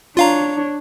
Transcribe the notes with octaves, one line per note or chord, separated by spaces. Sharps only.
D4 F4 C#5 F5 A#5